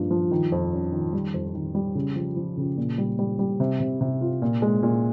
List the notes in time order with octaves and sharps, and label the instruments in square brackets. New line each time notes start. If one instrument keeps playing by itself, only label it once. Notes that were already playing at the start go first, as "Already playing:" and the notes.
Already playing: [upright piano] G2 F3 A#3
F3
D#3
F2
C#4
D#3
G3
F2
D#3
G3
C#3
F3
F3
C#3
A#2
G3
G3
G3
C3
C3
C3
F4
A#2
G#3
A#2